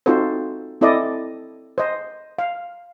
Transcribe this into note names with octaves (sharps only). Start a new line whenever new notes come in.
C4 D#4 F4 F#4 A4 C5
C4 E4 A4 D5 D#5
C5 D#5
F5